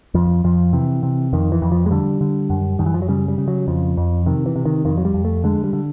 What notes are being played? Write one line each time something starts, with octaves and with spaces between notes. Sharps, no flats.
F2 F3
F2 F3
C3 E3
C3
F2 D#3
E3
F2
F3
G#3
D3 G3
D3
F#2
F#2 D#3
E3
F3
F#3
C#3 G3
G3
C#3
F#3
F2 F3
F2
C3 D#3
E3
C3
D#3
F2 D#3
F#3
G3
F2
A3
D3 G#3
G3
D3